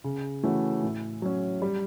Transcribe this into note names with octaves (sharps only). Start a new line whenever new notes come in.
C#3
E3 A3 C#4 F#4
A2
F#3 C#4
G3